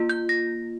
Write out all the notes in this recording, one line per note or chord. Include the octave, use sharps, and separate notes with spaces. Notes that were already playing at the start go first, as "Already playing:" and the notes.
Already playing: A#3 F4
G6
A#6